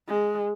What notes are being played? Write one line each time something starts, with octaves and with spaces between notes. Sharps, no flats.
G#3